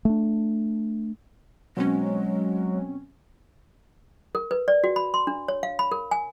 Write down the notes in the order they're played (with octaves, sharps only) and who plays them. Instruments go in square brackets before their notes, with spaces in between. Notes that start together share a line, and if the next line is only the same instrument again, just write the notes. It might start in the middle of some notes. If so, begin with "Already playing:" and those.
[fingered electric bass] A3 D4
[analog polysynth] B2 C4 C#4 [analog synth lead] F#3 [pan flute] G#3
[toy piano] A#4
B4
D5
F#4
B5
C6
D4
C#5
F5
B5
A#4
G#5